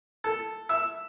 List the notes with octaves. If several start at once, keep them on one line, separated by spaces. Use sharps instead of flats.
A4
E5